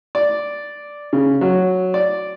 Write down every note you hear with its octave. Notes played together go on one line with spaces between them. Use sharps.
D5
C#3
F#3
D5